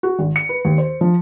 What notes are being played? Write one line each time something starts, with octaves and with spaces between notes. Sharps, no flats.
F#4
G#1
C#7
B4
D#2
C5
F3